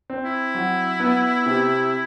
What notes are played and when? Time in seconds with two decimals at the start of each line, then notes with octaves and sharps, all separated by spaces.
0.10 C4
0.24 E4
0.55 F#3
1.00 B3
1.46 C3